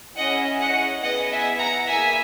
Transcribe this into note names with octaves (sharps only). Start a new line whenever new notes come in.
C#4 E4 G#4 D#5 F#5
D#5 F#5
B3 E4 G#4 D#5 F#5
E5 G#5
F#5 A#5
A#3 E4 G#4 E5 G#5